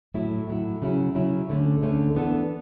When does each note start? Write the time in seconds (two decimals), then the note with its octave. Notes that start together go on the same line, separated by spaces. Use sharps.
0.14 A2 F#3 A3 E4
0.47 A2 F#3 A3 E4
0.82 C#3 F#3 C#4 E4
1.14 C#3 F#3 C#4 E4
1.49 D2 D3 A3 C#4
1.81 D2 D3 A3 C#4
2.15 E3 B3 D4 A4